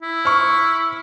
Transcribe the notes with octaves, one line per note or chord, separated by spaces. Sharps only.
E4
C#6 F6